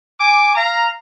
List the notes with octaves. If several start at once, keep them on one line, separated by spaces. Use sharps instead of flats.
G#5 D6
F5 A#5